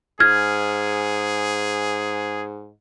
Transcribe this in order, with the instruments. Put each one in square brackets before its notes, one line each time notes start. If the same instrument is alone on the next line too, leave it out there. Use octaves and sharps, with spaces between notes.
[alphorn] G#2 [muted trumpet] G#4 [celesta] F6 G#6